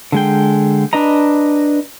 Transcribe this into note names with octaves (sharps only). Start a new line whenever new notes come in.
D3 G#3 G5
D4 B4 D#5 A#5